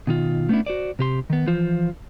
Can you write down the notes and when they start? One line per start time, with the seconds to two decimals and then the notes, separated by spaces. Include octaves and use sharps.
0.07 B2 D#3 F4
0.49 A3 B3 C#4 D4 E4
0.66 F#4 C5 D5
0.99 C3 G4 C6
1.30 D#3 B3
1.47 E3 F3 F4 C5